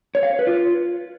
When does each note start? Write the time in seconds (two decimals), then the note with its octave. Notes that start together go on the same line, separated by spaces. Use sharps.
0.15 C#5
0.23 F5
0.31 C#5
0.39 B4
0.47 F4